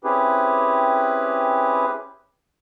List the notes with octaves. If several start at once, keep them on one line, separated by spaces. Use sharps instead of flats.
C4 C#4 E4 G4 G#4 B4